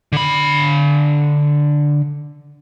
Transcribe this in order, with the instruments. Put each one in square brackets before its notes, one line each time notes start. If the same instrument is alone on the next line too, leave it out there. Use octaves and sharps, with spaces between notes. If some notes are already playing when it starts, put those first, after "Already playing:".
[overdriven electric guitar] D3 B5